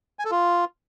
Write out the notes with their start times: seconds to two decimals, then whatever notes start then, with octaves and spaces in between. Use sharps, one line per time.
0.19 G#5
0.25 A4
0.31 F4